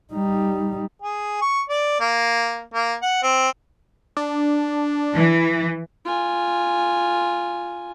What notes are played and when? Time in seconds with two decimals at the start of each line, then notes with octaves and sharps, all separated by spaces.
0.13 G3 D#4
1.02 G#4
1.41 C#6
1.69 D5
2.00 A#3
2.74 A#3
3.02 F#5
3.23 C4
4.17 D4
5.15 E3
6.05 F4 G#5